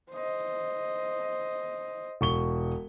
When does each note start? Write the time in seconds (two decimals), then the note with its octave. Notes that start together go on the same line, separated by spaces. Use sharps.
0.12 C5 D#5
2.21 E1 C#6 G7